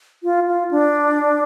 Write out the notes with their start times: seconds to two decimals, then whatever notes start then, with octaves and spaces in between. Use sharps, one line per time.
0.23 F4
0.47 F4
0.71 D4